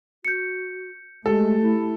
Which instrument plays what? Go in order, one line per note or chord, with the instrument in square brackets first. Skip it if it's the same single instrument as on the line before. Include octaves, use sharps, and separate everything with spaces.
[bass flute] F#4 [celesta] G6 C#7
[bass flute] G#3 [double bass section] A3 [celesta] G4 [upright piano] A4
[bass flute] E4